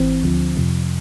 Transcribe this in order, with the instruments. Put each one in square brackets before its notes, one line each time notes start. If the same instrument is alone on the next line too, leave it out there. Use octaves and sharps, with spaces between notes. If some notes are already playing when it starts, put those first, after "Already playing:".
Already playing: [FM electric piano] G#1 E3 C4
D2 D3 F3
F2 C3 F3